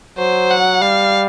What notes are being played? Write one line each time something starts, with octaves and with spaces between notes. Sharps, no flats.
F#3 C5
F#5
G3 F5